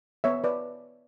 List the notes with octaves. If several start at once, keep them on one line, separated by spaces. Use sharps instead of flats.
B3 C#5 E5
B4 D5